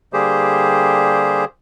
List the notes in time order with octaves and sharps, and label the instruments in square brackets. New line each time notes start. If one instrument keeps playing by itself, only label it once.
[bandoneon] D3 G3 A#3 G4 G#4 C5